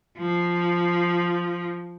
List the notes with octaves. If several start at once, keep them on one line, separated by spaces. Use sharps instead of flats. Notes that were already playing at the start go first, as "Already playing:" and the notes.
F3